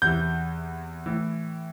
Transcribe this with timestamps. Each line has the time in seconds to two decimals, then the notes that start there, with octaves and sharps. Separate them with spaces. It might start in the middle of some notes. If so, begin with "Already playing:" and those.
0.02 E2 C3 E3 G6
1.06 A2 E3